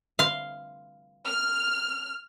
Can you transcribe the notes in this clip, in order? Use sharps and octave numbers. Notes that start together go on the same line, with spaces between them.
F5 C6
F6